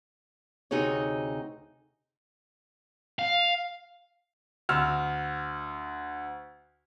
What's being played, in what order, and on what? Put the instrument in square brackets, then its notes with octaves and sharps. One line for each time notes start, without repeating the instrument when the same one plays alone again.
[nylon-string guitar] D2 C3 D#4 F#4 G#4 C#5
[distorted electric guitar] F5
[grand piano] D2 E6 F6